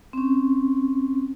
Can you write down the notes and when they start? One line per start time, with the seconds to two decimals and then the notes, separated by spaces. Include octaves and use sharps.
0.13 C4 C#4